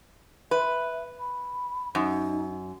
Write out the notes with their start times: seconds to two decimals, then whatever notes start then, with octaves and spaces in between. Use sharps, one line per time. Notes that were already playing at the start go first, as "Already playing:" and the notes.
0.51 B4 E5
1.19 B5
1.95 F#2 D#4